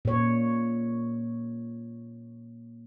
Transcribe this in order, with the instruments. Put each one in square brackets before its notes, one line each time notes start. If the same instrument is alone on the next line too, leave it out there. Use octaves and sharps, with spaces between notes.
[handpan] A#2 C#5